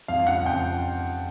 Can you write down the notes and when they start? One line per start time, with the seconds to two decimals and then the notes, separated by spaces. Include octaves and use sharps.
0.08 F2 F5
0.27 C#3 F#5
0.45 F2 G5